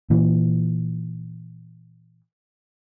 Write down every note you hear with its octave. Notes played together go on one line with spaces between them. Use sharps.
A#2 E3